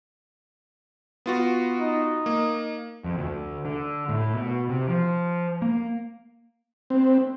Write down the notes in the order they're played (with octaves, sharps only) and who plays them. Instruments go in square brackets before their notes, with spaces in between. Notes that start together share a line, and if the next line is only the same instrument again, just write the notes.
[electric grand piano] B3 F4 F#4
[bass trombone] D#4
[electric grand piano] A#3
[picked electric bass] F2
D2
D3
A2
B2
C3
F3
A#3
[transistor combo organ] C4